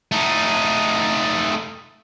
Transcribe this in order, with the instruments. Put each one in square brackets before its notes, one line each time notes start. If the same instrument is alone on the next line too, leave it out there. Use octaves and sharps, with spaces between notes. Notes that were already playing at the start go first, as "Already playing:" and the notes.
[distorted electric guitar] A3 D#4